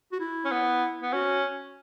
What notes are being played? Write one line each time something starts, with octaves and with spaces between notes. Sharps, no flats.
F#4
E4
C#4
B3
B3
C#4 F#4